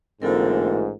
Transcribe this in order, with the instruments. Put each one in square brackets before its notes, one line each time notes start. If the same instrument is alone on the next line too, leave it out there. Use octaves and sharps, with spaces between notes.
[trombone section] A1 G#2 [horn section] D3 A#3 C4 [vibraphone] F4 A4 A#4